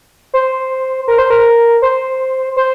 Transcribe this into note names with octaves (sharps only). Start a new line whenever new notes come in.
C5
A#4
C5
A#4
C5
C5